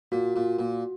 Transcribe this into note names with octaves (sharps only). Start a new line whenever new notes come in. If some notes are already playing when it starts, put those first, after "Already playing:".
A#2 F#4
A#2
A#2